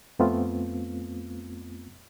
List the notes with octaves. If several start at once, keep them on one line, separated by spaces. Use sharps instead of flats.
F2 A3 B3 C4 F4